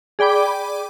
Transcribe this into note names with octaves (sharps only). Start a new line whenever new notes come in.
G#4 D5 G5 B5 D6